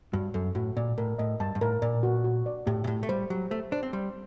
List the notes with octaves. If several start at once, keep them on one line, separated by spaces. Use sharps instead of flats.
G2 F#4
F#2 A4
A2 F#4
A#2 D5
A2 A#4
A2 D#5
G2 A5
G2
A2 A#4
A#2 D5
F#4
F#4
D5
A2 G4
A#2
A2 G4
A3
G3 C5
F#3 G4
A3 C5
D4 C5
C4
G3 C6